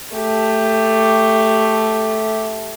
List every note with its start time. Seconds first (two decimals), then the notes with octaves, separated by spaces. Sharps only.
0.15 A3 G4